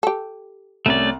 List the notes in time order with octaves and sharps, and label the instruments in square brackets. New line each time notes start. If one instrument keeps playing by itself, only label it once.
[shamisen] G4 A4
[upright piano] C2 [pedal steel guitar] A3 C#4 D5